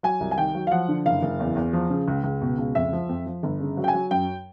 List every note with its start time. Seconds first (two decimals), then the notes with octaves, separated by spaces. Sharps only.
0.03 F#3 G#5
0.20 C2
0.31 G#5
0.37 D#3 G5
0.55 F#3
0.67 F5
0.71 F3 F#5
0.88 D3
1.06 F#1 F5
1.23 F#1
1.40 E2
1.56 E2
1.73 F3
1.90 C#3
2.08 C#2
2.24 C#2
2.41 B2
2.58 C#2
2.75 F2 E5
2.93 F3
3.09 F2
3.26 F3
3.43 G1
3.60 C#3
3.77 F#3
3.84 G5
3.88 G#5
3.94 F#3
4.11 F#2 G5